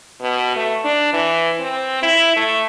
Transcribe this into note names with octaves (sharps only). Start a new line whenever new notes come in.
B2
A3
D4
E3
C4
E4
A3